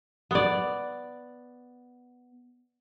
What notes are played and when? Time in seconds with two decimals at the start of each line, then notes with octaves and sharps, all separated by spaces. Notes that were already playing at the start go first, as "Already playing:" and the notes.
0.31 B3 D5